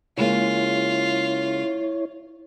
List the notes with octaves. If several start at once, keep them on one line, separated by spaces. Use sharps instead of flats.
C#3 G#3 A#3 E4 F4 C#5